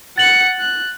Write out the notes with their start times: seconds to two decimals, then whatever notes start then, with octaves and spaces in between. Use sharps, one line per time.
0.18 F#5 A6 C#7 F#7
0.60 F#6